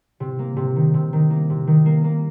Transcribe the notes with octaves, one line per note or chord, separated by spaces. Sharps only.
C3
A#3
C3
D#3
C3
D#3
A#3
C3
D#3
A#3
A#3